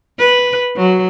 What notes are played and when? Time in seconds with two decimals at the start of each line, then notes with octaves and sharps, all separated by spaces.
0.19 B4
0.76 F#3